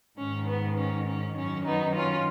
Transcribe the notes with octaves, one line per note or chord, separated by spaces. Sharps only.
G#2 D#3 C#4
B3
C#4
C#4
F#2 D#3 C#4
B3 D#4
C#4 F4